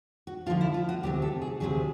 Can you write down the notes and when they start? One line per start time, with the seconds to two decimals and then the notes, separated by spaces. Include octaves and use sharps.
0.27 F#4
0.46 D2 D3 F3 F4
0.61 E4
0.74 F4
0.89 F#4
1.03 D2 C3 D#3 F#3 G4
1.22 A4
1.42 G#4
1.60 D2 C3 D#3 F#3 G#4